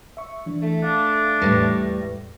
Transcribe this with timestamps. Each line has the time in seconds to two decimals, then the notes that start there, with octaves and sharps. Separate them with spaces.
0.17 E5 C#6
0.46 E3 D4
0.62 A3
0.83 D4 F5
1.42 E2 A2 G3 B4 A#6